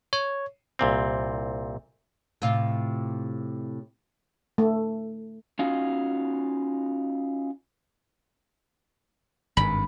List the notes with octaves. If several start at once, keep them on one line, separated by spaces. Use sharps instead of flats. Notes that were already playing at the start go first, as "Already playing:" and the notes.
C#5
C2 A#2 C4
A2 C3 F4
A3
C#4 D#4 F4 F#4
G#1 G2 B5